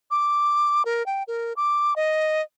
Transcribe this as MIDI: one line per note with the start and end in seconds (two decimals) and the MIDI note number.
0.11 0.83 86
0.85 1.05 70
1.06 1.23 79
1.28 1.53 70
1.56 1.94 86
1.96 2.42 75